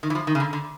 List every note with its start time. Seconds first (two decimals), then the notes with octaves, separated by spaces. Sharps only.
0.03 D#3
0.10 E3
0.15 F3
0.27 D#3
0.35 C#3
0.40 D3
0.53 D3